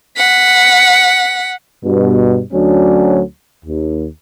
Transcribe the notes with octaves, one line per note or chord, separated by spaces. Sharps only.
F#5 B6
G2 B2
D2 F#3 C#4 D4
D#2